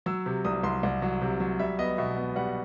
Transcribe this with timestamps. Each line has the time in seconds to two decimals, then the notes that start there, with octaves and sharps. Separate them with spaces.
0.06 F#3 E6
0.26 C3
0.45 C2 D#6
0.63 C2 C6
0.83 C2
1.02 F#3
1.21 C3
1.40 F#3
1.59 G3 E5
1.79 B3 D#5
1.98 B2 E5
2.16 B3
2.36 G3 F#5